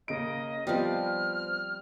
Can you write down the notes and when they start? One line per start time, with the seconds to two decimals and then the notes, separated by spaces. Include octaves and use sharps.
0.08 C#3 A#3 D#5 D7
0.67 F3 G3 B3 C4 D#5 F6